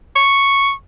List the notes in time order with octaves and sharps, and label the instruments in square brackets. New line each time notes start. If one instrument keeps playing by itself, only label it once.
[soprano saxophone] C#6